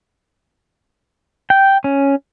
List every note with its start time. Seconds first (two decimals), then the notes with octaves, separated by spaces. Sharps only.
1.50 G5
1.84 C#4